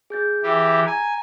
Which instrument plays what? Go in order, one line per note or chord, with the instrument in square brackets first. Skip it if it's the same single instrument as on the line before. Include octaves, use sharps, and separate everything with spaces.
[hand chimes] G#4 G6 A6
[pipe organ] E3 G4
[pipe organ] G#5 [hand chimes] A#5